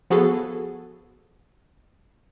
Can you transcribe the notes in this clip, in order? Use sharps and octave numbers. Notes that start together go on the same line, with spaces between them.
F3 B3 F#4 G#4 A4